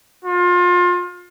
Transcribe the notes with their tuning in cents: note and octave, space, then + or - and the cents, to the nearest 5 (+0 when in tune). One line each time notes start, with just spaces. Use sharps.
F4 +30